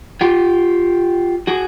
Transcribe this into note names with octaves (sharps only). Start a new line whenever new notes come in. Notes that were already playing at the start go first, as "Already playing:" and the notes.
F4 G4
F#4 G#4